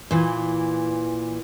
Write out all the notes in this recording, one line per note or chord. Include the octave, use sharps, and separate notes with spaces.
A#2 E3